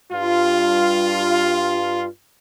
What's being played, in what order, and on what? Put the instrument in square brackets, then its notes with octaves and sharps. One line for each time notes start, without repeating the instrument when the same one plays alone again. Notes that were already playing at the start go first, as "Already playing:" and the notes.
[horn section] G2 F4